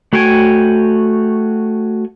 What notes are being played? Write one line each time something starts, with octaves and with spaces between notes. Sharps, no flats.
A3 F#4 C#5 G5 G#5